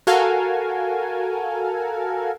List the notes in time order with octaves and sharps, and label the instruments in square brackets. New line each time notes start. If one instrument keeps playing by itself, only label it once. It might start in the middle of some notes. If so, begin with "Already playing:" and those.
[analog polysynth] F#4 A4 A#4 F5 G#5